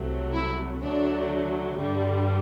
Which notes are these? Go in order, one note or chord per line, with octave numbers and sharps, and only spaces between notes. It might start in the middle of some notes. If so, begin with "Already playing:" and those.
Already playing: C2 C3 F#3 A3
E4
D2 D3 F#3 A3 D4
G2 D3 G3